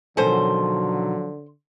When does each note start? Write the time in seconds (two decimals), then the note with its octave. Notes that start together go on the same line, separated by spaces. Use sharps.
0.17 B2 D3 D#3 F3 F#3 C#4 A4 C5